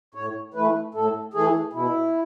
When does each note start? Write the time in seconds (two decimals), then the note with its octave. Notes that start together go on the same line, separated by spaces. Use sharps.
0.14 A2 C#5
0.54 E3 A3 B4
0.94 A2 A4
1.33 E3 A3 G#4
1.73 B2 E4